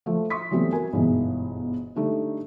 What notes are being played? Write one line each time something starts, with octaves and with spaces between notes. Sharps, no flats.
F3 A3
C6 C#6 D#6 B6
E3 F#3 G3 A3 B3 C4
F#4 A#4 G#5
G1 G#2 B2 E3
D3 G3 A3 D4 D#4